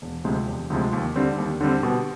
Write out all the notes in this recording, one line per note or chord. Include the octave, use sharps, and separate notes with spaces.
E1
D2 C3 F3 G#3
E1
D2 C3 F3 G#3
D#2
D3 G3 C4
D#2
D3 G3 C4
B2